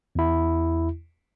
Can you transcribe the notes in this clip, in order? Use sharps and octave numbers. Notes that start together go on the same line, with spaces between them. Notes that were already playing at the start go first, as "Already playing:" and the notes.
E2 E4